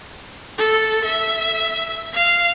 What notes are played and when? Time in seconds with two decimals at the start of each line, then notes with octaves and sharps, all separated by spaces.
0.58 A4
1.04 E5
2.13 F5